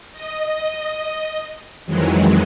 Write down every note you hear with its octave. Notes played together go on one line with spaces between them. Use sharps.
D#5
F2 D#3 E3 F#3 G#3